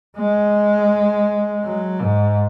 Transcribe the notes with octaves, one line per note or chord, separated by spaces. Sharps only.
G#3
F#3
G#2